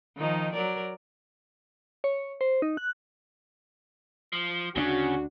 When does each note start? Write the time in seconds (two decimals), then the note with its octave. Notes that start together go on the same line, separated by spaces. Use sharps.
0.18 D#3 F3 D#4
0.53 F#3 A#4 D5
2.04 C#5
2.41 C5
2.62 D#4
2.77 F#6
4.33 F3
4.76 D2 C#3 C4 D4 F#4